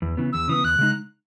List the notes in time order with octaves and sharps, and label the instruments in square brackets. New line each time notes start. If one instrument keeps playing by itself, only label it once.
[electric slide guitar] E2
C#3 E3 B3
[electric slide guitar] E2 [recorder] E6
[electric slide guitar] C#3 E3 B3 [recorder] D#6
[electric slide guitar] E2 [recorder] F#6
[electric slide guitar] C#3 G#3 D#4